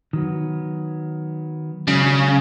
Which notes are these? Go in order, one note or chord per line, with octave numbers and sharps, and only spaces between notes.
D#3 F#3 B3
C#3 F#3 G#3 D4